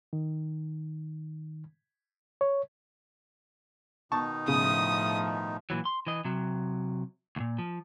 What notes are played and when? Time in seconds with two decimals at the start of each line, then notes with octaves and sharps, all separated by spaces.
0.13 D#3
2.41 C#5
4.12 B2 D#3 D#4 A5 C#6
4.48 A2 C#3 F3 D#6
5.70 A#2 E3 F#3
5.85 C6
6.07 E3 D#5
6.25 C3 F#3
7.36 D2 A#2
7.58 F3